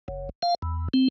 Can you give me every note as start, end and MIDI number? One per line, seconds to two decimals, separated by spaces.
0.08 0.29 30
0.42 0.55 77
0.62 0.88 40
0.94 1.08 60